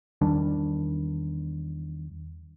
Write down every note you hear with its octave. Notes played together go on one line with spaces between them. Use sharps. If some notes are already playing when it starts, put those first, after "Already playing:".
E2 D#3 G3 D4